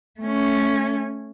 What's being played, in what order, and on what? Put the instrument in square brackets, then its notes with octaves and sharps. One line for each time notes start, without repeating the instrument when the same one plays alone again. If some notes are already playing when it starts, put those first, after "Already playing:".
[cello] A3 C#4